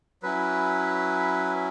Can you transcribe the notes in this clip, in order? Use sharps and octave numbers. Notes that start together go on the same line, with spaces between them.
F#3 C#4 E4 B4